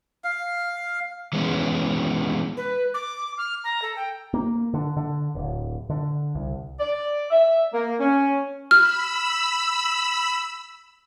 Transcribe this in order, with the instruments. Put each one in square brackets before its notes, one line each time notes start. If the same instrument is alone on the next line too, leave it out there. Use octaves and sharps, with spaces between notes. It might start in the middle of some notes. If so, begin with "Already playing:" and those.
[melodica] F5
[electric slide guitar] E3 G#3 B3 C#4
[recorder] B4
D6
F6
A#5
A4
G5
[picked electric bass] A#3
D3
D3
D1
D3
C2
[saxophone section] D5
E5
A#3
C#4
[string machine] B5 E6 [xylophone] F6